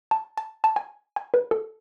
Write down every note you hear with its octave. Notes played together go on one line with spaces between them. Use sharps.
A5
A5
A5
G#5
G#5
B4
A4